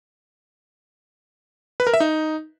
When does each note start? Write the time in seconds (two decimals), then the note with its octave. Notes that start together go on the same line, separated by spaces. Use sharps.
1.80 B4
1.87 A#4
1.94 E5
2.00 D#4